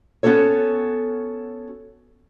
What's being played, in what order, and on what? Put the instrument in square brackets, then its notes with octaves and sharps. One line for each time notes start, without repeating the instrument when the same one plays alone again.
[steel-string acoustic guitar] B3 C#4 F#4 A4 C#5